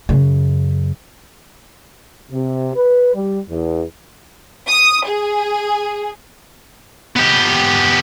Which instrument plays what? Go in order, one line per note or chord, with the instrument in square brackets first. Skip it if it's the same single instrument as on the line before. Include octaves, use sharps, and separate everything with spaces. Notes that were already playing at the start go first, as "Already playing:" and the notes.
[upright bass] F#2 C#3
[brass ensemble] C3
B4
G3
E2
[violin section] D#6
G#4
[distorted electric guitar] B3 G4